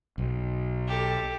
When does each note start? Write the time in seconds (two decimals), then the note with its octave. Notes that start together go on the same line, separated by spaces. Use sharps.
0.18 B1
0.87 G4 A4